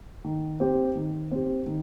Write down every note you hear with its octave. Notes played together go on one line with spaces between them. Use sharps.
D#3
C4 G4
D#3
C4 G4
D#3